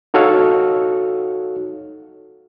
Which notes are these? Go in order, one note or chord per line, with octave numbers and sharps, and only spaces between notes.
D#4 F#4 A4 C#5 F5